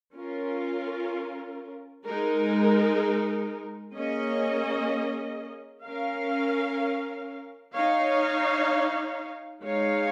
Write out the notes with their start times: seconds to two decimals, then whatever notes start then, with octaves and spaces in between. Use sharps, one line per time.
0.15 C#4 F4 A#4
2.06 G#3 D#4 A#4
3.95 A#3 C#4 G#4 D#5
5.85 C#4 A#4 F5
7.75 D#4 C#5 F5
9.64 G#3 D#4 C#5 F5